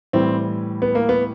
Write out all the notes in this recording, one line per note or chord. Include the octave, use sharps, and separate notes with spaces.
A2 E3 G3 C4
B3
A#3
B3